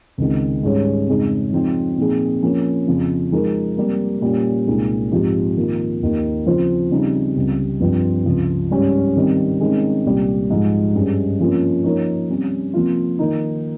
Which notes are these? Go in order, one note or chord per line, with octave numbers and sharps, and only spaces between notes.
C#2 C3 D#3 G#3
G#2 G3 C#4 G#4 C#5
F2 C#3 G#3 D#4 G#4
F3 G#3 C4 D#4
A#2 F3 C4 D#4 G#4
F3 A#3 C#4
F2 C#3 F3
F3 G#3 D#4 A#4
C3 G3 A#3
A#2 G3 C#4 G4
C2 A#2 G#3 D#4
G#2 F3 C4 G4
D#3 A#3 F4
D#2 D#3 A#3
C#3 F3 C4 F4 C5
C#3 G3 C4 D#4
C#2 C3 G3
G2 F3 C4
C#2 C3 F3
G#2 G3 C#4 G4
C3 D#3 G3 C4
C3 D#3 G#3 C#4
C2 A#2 G3
G#2 F3 G#3
G2 G3 C#4 G#4
C3 F3 A#3 C#4 F4
F3 A#3 D#4 A#4 C#5
C3 G3 C#4
C3 F3 A#3 F4
D#3 A#3 D#4